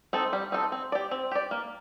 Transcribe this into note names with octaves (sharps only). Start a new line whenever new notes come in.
C4 D#4 A4
G3
C4 D#4 A4
C4
G4 D5
C4
G4 D5
A#3